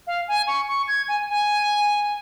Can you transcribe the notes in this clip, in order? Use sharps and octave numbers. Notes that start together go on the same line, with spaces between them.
F5
G#5
C#6
C#6
G#6
G#5
G#5